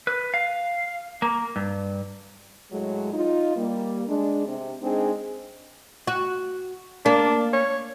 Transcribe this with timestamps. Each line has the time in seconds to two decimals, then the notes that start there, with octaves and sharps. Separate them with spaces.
0.07 B4
0.34 F5
1.22 A#3
1.56 G2
2.71 A2 F#3 G#3
3.13 D#4 F4
3.57 G3 A#3
4.08 G#3 D4
4.47 C3
4.81 G#3 C4 D4 D#4 G#4
6.07 F#4
7.06 A#3 D4
7.53 C#5